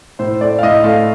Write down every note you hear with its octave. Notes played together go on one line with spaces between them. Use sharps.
A2 C5
A3 D5
F5
A2 D#5
A3 F5